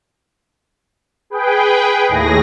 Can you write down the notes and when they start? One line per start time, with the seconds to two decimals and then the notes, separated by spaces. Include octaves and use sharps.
1.30 G#4 B4 G5
2.08 D#2 A2 G#4 A#6